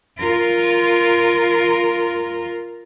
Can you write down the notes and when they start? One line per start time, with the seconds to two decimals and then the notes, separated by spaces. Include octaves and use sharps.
0.18 F4 A#4